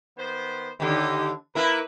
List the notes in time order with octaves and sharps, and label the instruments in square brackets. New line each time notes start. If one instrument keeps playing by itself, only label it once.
[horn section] D#3 B3 C5
[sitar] D#2 D3 [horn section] D#4 G4
[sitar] A#3 E4 A#4 [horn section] B4